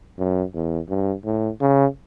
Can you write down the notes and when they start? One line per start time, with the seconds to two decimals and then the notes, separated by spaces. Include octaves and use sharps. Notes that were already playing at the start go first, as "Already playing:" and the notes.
0.19 F#2
0.55 E2
0.90 G2
1.25 A2
1.61 C#3